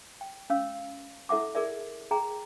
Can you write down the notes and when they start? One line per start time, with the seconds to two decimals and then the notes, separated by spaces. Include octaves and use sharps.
0.21 G5
0.50 C#4 F5 E6
1.29 E4 A4 E5 F#5 D6
1.55 G#4 A#4 D5 E5
2.11 G#4 G5 A#5